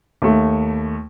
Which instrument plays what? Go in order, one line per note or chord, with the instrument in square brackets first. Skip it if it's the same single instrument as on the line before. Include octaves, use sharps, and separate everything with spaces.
[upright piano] D#2 A3